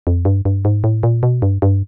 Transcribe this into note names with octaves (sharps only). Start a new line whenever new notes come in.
F2
G2
G2
G#2
A2
A#2
B2
G2
G2